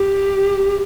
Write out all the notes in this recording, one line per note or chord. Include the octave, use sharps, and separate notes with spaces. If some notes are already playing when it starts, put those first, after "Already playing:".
Already playing: G4